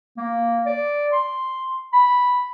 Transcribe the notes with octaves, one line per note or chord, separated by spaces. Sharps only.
A#3
D5
C6
B5